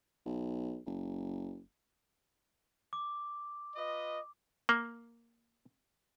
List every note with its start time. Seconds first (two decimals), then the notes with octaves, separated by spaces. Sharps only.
0.25 B1
0.86 F#1
2.93 D6
3.76 F4 B4 D#5
4.69 A#3